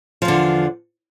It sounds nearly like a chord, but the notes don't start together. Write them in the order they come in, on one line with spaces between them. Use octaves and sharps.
F3 E2 D3